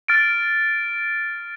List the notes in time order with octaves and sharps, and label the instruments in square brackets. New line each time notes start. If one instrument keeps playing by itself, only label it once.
[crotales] F6 A6 D7